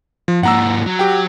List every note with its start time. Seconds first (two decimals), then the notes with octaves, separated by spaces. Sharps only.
0.28 F3
0.43 G#2 A#3 F#5 A#5 E6
0.87 F#3
0.99 G4 G5